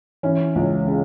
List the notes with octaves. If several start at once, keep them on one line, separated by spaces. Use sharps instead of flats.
E3 C#4
C#2
C#3